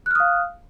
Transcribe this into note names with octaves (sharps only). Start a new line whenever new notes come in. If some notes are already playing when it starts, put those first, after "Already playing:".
F5 D#6 F6 F#6